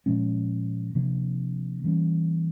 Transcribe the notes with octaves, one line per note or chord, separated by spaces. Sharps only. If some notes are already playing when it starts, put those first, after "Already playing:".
A#2 F3 G#3 C#4
C3 F3 A#3 D4
E3 G3 A#3 C#4